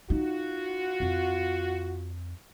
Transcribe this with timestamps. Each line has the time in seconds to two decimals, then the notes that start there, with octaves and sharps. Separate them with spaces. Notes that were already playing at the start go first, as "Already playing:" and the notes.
0.10 D#4 F4 F#4
1.00 F2